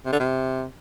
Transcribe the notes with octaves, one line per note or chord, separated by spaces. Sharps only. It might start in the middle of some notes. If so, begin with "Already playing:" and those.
C3
D3
C3